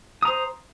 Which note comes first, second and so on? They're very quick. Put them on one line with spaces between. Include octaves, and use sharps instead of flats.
D#6 A#5 C5